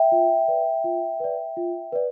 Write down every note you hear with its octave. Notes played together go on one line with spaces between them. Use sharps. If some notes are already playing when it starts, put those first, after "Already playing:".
Already playing: E5 G5
F4
B4 D5
F4
B4 D5
F4
B4 D5